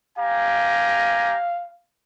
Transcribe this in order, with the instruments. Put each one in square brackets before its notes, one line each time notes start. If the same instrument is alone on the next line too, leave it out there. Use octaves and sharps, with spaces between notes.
[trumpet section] G4 G#5 A#5 [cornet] F5